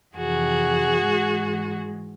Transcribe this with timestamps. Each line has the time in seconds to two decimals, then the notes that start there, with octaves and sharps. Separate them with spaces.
0.16 F2 C3 E3 F#4 G#4
1.04 G#2 E3 G#3